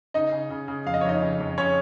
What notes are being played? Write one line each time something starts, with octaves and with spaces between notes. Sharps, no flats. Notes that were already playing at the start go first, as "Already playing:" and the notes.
C#3 D#4 D#5
C#3
C#3
C#3
F2 F5
D#5
C#5
F2 D#4 D#5
C#3
F2
C#3 C#4 C#5